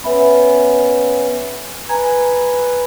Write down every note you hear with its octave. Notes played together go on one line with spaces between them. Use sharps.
B3 C#4 B4 E5 B5
B4 G#5 A#5 G#6